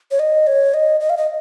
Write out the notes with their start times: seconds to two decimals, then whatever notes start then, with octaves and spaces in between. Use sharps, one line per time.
0.11 C#5
0.19 D#5
0.47 C#5
0.74 D#5
1.00 D#5
1.10 F5
1.17 D#5